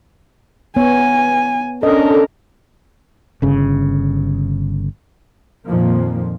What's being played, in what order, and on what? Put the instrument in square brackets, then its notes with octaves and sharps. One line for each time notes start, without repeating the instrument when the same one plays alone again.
[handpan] B3 C#5 [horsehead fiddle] G#5
[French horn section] C#4 D4 A4 [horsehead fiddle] A#4 [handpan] D#5
[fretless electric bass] G1 C#3
[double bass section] F2 A#2 D#3 F3 A#3